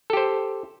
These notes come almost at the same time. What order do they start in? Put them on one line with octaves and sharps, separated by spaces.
A4 G4 C5